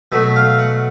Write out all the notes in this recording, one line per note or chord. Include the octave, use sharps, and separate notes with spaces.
B2 F#3 A3 E5
F5
F#5